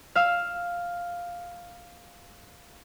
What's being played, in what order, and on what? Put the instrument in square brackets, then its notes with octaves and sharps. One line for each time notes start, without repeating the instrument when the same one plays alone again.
[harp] F5 E6